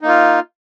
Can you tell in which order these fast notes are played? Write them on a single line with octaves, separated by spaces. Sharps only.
D#4 A#3 F4